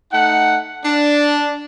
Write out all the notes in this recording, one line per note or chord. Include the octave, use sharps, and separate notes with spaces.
A3 D#4 F#5
D4